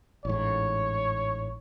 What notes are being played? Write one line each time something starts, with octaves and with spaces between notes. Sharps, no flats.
A1 G#2 C#5